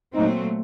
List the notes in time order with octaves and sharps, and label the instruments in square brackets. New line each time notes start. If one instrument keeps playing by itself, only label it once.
[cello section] A#2 F#3 A3 C4 [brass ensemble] D#4